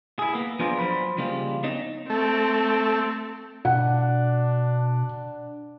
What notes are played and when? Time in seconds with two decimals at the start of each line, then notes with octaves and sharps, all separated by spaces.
0.19 E4 G#4
0.33 A#3 B3
0.59 F3 B3 D4 F4 G#4 A#4
0.79 F3 F#3 C5 B5
1.17 C#3 F3 G3 G#3 A#3 F4
1.63 B3 C4 D#4 C#5 D#5
2.10 A3 C4
3.65 B2 D4 F#5